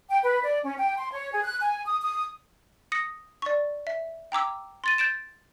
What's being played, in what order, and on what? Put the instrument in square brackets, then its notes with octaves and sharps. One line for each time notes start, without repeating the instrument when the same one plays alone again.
[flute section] G5
B4
D5
C#4
G5
C6
C#5
G#4
F#6
G#5
D#6
D#6
[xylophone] D#6 A#6 C#7
D5 C#6
E5
G5 A#5 D6 E6
C6 A6 D#7
G6 A6 D7 E7